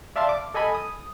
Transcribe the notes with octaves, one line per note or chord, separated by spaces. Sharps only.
D5 E5 F5 A5 C6
D6
A4 D#5 G#5 B5
D#6